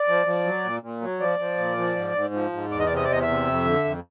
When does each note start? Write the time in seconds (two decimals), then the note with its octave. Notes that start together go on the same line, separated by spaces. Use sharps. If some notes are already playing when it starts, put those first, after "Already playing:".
Already playing: D5
0.08 F3
0.26 F3
0.45 F#3
0.65 A#2
0.83 A#2
1.02 F#3
1.20 F3 D5
1.39 F3
1.58 A#2
1.77 F3
1.96 G#2
2.15 G#2
2.34 F3
2.53 G#2
2.71 E2 D5
2.80 D#5
2.86 D5
2.90 C3
2.96 D#5
3.04 D5
3.09 E2 D#5
3.22 E5
3.27 C3
3.47 F2
3.65 D3
3.85 F2